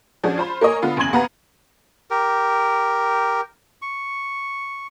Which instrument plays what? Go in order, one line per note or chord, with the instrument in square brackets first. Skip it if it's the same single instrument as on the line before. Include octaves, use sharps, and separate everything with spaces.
[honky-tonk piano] F3 C#4 D4 F#4 G#4
F4 C5 B5
A#3 A#4 C#5 D#5 G#5
D3 B3 F4 F5 B5 D#6
F#1 E2 C#3 C6 G#6 F#7
D#2 B3 B4 F5 A#5
[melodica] G4 A#4
C#6